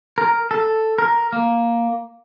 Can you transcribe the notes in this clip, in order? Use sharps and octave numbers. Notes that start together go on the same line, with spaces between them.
A#4
A4
A#4
A#3